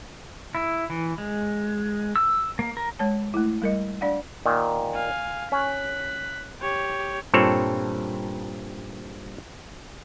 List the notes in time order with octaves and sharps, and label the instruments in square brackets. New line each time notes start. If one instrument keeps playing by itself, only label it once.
[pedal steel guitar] E4
E3
G#3
E6
A#3
A#4
[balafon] G#3 C#5 A5
A3 E4
G3 A#4 D#5
D4 D5 F5 F#5
[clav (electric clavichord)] A#2 D#3
[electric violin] F5 G#5
[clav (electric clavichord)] C#4 [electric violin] F#6 B6
[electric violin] G4 C#5
[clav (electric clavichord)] G2 A#2 C4 A4 C#5